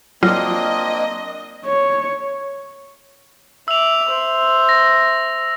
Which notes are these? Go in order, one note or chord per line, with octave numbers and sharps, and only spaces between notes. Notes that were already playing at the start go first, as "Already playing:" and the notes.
F#3 A#3 C4 D4 F4 D#5
C#5
E5 D6 E6 F7
C5 E5
A#6